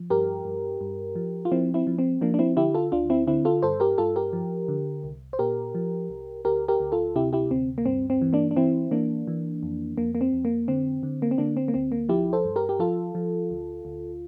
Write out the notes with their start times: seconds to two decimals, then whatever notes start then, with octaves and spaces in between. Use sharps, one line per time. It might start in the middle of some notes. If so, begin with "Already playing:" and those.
Already playing: F3
0.10 G2 G4 A#4
0.45 G2
0.81 G2
1.15 F3
1.45 F4
1.51 F3 C4 E4
1.74 C4 E4
1.87 F3
1.99 C4
2.21 F3 A#3 D4
2.34 D4
2.39 C4 E4
2.57 D3 E4 G4
2.74 F4 A4
2.92 D2 D4 F4
3.10 C4 E4
3.27 D3 C4 E4
3.45 F4 A4
3.63 G2 A4 C5
3.80 G4 A#4
3.98 G2 F4 A4
4.16 G4 A#4
4.33 F3
4.68 D3
5.04 C2
5.33 C5
5.39 A#2 G4 A#4
5.75 F3
6.10 C2
6.45 D2 G4 A#4
6.68 G4 A#4
6.80 D2
6.92 F4 A4
7.16 C3 E4 G4
7.33 E4 G4
7.51 D2 C4
7.78 A#3
7.86 G2 C4
8.10 C4
8.22 E3
8.33 A#3 D4
8.51 D4
8.56 E3 C4 E4
8.91 E3 A#3 D4
9.27 E3
9.63 F2
9.98 F2 A#3
10.15 A#3
10.21 C4
10.33 F2
10.45 A#3
10.68 D3 C4
11.03 D3
11.22 A#3
11.31 C4
11.38 D3 A#3 D4
11.57 C4
11.68 A#3
11.74 D2 C4
11.92 A#3
12.09 F3 E4 G4
12.33 A4 C5
12.44 G2
12.56 G4 A#4
12.69 G4
12.79 F3 F4 A4
13.15 F3
13.51 D2
13.85 D2